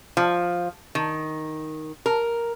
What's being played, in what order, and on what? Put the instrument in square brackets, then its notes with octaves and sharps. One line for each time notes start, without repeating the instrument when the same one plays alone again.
[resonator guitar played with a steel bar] F3
D#3
A#4